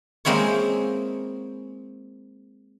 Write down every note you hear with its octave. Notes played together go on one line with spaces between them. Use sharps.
G#3 A#3 C4 E4 C#5